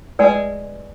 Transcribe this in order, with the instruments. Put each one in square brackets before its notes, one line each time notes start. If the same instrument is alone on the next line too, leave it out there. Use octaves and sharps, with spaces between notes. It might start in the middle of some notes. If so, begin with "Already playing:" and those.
[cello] G#3 [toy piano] B4 D5 G#5